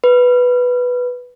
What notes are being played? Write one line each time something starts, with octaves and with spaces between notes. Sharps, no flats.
B4